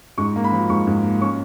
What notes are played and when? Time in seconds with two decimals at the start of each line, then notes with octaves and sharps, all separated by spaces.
0.18 G#2 C#6
0.36 A#3
0.44 B5
0.52 F3
0.70 G#2 C#6
0.87 G#2
1.04 A#3
1.21 C#4 C#6